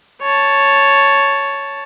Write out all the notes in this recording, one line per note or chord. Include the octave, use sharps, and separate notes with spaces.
C#5 A5